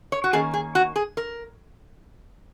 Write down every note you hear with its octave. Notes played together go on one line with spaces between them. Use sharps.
C#5
F#4
D#3 A#3 C#4 G#4
G#4
F#4
G#4
A#4